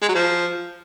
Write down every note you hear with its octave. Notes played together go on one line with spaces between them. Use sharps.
G#3
F#3
F3